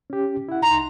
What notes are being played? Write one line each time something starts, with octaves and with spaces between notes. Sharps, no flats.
C#4 G4
E4 F#5
C2 D#4 A#5 C6